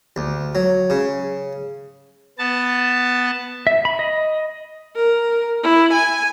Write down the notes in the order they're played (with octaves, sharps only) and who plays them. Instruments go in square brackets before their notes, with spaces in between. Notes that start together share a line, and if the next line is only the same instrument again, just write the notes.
[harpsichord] D2
F#3
C#3
[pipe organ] B3 A5
[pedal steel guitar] E5
B5
D#5
[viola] A#4
E4
G#5